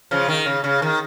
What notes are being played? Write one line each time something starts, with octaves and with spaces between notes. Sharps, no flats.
C#3 F3
D#3
C#3
C#3
D#3